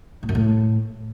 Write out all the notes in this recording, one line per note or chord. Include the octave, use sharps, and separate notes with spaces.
A2
F#2
A2